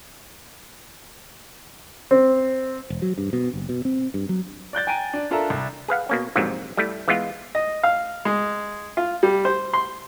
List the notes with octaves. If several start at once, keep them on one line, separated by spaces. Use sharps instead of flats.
C4
E1
F#3
G2
B2
F#1
B2
C4
G2
F#3
D5 F#6 G6 A6
G5 G#5 A#5 D7 D#7
D4
D4 F4 A4 A#4 E5 A#5
C2
G#4 B4 F5 F#5
B2 A#3 C#4
A#1 F2 G#2 C3 F#3
G3 A3 E4
E3 G#3 B3 F4
D#5
F5
G#3
F4
G3
C5
C6